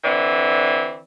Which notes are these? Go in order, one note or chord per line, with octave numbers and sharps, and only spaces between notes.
D3 E3 C4 D5